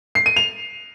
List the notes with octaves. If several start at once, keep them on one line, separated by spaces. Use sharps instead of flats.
C7
D#7
F7